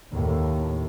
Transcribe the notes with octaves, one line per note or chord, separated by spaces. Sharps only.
D#2 A2